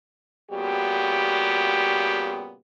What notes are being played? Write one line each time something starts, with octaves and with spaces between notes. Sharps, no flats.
A#2 C#3 G3 B3 F#4 G4